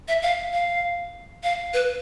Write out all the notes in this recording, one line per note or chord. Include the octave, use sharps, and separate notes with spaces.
E5
F5
F5
F5
B4